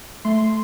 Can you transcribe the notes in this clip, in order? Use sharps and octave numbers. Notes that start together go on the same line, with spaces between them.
A3 C6